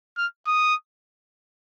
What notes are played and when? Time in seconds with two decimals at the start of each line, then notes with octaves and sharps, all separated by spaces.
0.17 F6
0.47 D#6